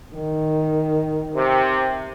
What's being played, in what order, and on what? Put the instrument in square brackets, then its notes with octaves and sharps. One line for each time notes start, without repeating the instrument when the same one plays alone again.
[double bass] D#3
[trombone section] C3